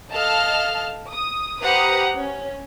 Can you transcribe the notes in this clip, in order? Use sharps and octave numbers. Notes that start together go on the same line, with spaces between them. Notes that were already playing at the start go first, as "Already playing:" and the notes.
A4 D#5 F5 A5 F6
D#6
G4 B4 C5 F#5 A#5 D#6
C#4